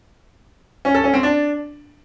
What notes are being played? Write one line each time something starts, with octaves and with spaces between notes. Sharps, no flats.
C#4
A4
C#4
C4
D4